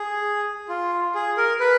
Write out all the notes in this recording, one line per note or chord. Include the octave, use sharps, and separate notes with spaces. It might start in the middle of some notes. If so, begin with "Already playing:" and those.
Already playing: G#4
F4
G#4
A#4
B4